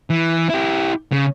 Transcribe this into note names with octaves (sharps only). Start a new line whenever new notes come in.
E3
E4 G4
C#3